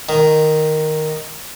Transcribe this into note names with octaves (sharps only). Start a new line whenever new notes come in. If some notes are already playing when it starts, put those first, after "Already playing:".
D#3